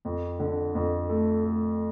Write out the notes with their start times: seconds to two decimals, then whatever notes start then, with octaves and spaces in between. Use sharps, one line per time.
0.05 F2
0.39 D3
0.75 F2
1.09 A3
1.45 A3